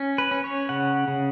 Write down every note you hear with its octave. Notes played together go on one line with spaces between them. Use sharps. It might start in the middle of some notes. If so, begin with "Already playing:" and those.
Already playing: C#4
B4
C#4
C#5
C#3 F#5
C#3